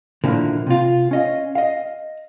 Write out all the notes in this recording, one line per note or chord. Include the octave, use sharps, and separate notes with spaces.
A#2 D3 D#3 F3 A#3 E4
C3 F4
C#4 D#5 F5
D#5 F5